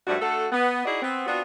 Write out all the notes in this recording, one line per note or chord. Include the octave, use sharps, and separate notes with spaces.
G2 F3 G3 A3 F#4
A3 D4 F#4 A4
B3
D#4 E4 F#4 G#4 D5 D#5
B3 C4
B3 C4 D4 F4 F#4